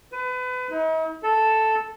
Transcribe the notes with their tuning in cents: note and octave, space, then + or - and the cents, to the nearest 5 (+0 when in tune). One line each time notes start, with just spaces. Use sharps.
B4 +30
D#4 +45
A4 +0